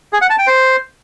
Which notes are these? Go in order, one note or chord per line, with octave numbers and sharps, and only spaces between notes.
G#4
F#5
A5
G5
C5